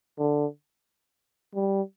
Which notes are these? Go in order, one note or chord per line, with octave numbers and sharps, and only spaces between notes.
D3
G3